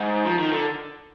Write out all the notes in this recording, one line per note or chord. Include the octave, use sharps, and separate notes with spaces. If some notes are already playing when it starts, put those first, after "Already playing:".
Already playing: G#2
F3
D#3
D3